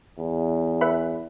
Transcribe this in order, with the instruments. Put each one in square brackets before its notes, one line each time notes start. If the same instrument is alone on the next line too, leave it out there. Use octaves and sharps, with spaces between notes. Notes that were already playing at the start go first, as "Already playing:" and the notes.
[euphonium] E2
[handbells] B4 E5 B5